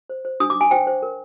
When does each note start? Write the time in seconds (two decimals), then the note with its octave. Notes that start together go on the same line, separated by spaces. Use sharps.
0.10 C5
0.25 C5
0.40 D4 D#6
0.50 D6
0.56 D4 G#5
0.71 C5 G5
0.87 C5
1.03 A#4